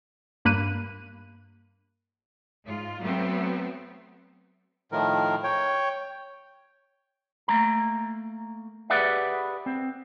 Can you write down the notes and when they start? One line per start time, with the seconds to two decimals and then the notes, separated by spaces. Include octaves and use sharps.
0.45 G2 A#3 B5 F#6 D#7
2.66 G#2 F4
2.99 F#3 A3 B3 C4
4.92 A2 D#3 F3 A#4
5.44 C#5 G5
7.48 A3 A#3 A#5
8.90 G4 G#4 B4 D5 E5 F#5
9.66 C4